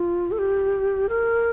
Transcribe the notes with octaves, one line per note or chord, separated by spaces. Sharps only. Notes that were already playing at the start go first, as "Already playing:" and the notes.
Already playing: F4
A4
G4
A#4